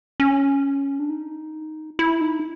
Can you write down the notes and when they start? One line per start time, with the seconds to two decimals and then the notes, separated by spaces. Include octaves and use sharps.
0.20 C#4
0.99 D4
1.10 D#4
1.99 E4
2.21 D#4